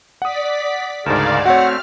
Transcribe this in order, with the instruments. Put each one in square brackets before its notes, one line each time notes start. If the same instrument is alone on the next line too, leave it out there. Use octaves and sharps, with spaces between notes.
[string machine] D5 B6 [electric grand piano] F#5 D#6
[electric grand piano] D2 G#2 [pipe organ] C#3 A#4 A5 [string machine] D5 F5
[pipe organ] A3 C4 [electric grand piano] F#4 C#5 [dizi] F#5 [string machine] F6